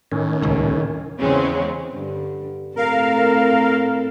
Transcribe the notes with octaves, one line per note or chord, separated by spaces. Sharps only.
A2 D#3 C#4
D#1 C#2
E2 C#3 G#3 C4 C#4
G2 D3
A2 C4 A4 A#4 F5